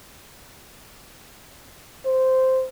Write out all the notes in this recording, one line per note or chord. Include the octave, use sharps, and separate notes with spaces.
C5